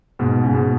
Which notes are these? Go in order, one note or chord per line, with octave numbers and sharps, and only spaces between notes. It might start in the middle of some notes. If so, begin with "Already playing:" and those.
G#2 B2
C#3
G#2 B2